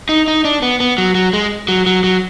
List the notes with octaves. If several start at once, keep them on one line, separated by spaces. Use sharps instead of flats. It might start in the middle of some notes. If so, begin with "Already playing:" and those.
D#4
D#4
D4
B3
B3
F#3
F#3
G#3
F#3
F#3
F#3